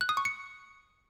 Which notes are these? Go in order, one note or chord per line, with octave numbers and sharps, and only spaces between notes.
F#6
D#6
C#6
C#7